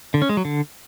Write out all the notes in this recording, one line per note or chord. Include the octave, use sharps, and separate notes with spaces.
D3
C#4
G#3
F#3
D3